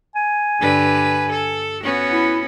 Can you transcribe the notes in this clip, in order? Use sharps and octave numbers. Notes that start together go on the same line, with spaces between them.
G#5
G2 D3 B4
A4
B3 C#4 F#4
E4